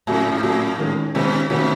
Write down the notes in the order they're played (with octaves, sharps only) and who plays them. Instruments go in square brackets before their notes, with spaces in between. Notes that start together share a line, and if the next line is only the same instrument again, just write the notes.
[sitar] A2 [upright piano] C#3 F#3 A3
[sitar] G#2
[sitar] A2 [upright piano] C#3 F#3 A3
[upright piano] D#3 G#3 C#4
[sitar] B2 [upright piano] D#3 G#3 C#4
[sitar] B2 [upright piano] D#3 A3 C#4 F#4